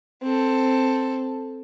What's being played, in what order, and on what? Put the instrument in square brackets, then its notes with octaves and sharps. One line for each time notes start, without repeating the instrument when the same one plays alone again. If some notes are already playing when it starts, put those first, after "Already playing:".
[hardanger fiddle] C4 A4